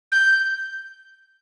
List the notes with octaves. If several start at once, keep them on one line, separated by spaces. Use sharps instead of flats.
G6